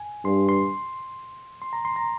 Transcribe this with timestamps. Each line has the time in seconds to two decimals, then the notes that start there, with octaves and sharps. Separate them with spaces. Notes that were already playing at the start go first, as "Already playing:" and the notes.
Already playing: G#5
0.25 G2 C6
0.49 C6
1.62 C6
1.73 A#5
1.85 C6
1.96 A#5